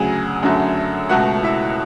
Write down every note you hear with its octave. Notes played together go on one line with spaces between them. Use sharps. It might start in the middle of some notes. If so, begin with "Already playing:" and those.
Already playing: D2 C#3 F#3 G#4 G#5
F#2 D3 F#3 A3
C#2 B2 A3 F#4 F#5
E4 E5